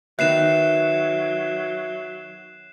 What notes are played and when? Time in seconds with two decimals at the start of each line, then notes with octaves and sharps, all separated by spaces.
0.19 D#3 F#3 B3 E5 F#6 C7 E7